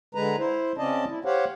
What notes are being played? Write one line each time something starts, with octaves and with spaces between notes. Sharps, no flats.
D3 G#3 B4 A#5
E4 C5
C#3 C4 C#4 D5 D#5 A5
E4
G4 C5 C#5 F5 F#5